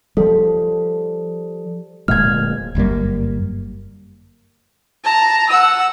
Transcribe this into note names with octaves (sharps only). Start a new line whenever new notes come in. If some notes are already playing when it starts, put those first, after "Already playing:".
F3 G3 A4
D1 A#2 G#3 F6 G#6
G1 F#2 G3 A#3
A5 A#5
F#5 E6